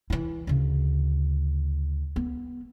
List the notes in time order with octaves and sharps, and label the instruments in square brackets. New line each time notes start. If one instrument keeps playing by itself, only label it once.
[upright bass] E3 E4
D2 C#3
B3